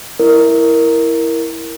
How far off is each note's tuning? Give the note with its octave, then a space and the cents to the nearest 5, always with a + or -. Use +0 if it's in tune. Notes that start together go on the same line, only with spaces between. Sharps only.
E4 +0 A#4 +0